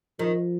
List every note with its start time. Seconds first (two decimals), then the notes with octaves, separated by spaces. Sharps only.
0.19 D#3 F3